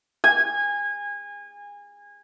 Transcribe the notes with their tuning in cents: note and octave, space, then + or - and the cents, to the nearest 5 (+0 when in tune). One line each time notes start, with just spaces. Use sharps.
G#5 -25